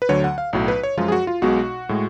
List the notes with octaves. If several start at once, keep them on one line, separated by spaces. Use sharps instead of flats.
B4
D2 D3 F#3 C#5
F#5
F5
B1 A2 F#3
B4
C#5
F#2 F3 G#3 F4
G#4
F#4
F4
B1 B2 G#3 F#4
A2 G#3